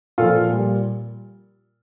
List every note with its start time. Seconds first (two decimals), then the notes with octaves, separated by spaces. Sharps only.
0.18 A#2 F3 F4 A4
0.49 A#2 G3